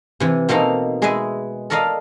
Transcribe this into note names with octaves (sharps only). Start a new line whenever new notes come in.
C3 E3
B2 A#3 C4 D#4 A4 A#5
G#3 G#4 B4 D#5 E5 G#5
A4 A#4 D5 D#5 F5 A#5